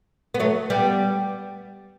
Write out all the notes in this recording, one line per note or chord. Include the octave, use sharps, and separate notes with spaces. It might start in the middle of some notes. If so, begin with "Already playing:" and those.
B3
F#3 A3
G3 B3